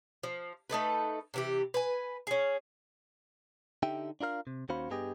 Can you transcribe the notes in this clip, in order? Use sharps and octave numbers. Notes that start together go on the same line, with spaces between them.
F3
A3 D#4 A4 B4
C3 E3 G4
B4 G#5
C#4 G#4
D3 D#4 G4 E5 G5
D4 F4 A#4 F5
C3
D#2 C#4 F#4 C5 F5 B5
G2 G3 B3 G4 G#4 D#5